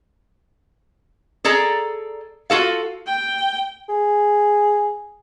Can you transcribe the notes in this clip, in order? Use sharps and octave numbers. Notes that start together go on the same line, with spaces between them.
G#4 A4 D5 A#5
F4 F#4 A4 F5
G5
G#4